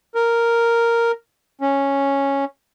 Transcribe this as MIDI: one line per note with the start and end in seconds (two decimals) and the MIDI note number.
0.15 1.12 70
1.61 2.45 61